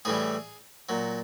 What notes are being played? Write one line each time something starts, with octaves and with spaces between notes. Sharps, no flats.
A2 E3 G3 G#4
A#2 F#3